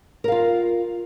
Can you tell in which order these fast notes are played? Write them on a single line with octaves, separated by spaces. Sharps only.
A#4 F5 F4